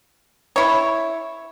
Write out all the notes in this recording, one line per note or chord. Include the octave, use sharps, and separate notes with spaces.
E4 C#5